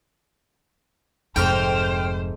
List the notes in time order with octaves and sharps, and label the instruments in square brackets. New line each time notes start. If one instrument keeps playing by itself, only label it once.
[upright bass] F1 F2 [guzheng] G#2 A3 [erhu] C5 [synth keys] G5 F6